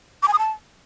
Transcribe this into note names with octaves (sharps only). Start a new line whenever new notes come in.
D6
G#5
D#6
A5